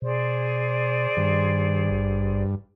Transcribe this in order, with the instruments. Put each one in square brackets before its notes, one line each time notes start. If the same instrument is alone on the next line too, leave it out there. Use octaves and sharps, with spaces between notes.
[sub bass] B2 [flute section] G#4 C5 D5
[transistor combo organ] G2 [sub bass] D#3
[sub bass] G#1